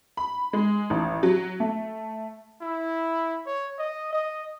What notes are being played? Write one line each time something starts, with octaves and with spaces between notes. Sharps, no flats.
B5
G#3
A1
F#3
A3
E4
C#5
D#5
D#5